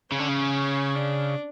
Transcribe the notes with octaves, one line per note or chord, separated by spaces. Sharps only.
C#3 C#4
D3
C#3
D4